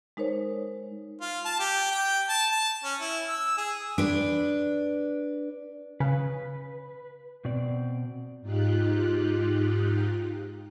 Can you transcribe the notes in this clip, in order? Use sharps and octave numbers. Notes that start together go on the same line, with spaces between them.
G#3 D#4 A#4 C5 C#5
F4
A5
G4
G5
A5
A5
C#4
E4
E6
G#4
D4 B4
C#3 B4
B2 C4 D5
G#2 D#4 F4 G4 F#6